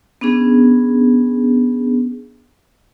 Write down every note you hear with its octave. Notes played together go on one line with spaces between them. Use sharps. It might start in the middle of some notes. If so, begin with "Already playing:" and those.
B3 C#4 D4 G#4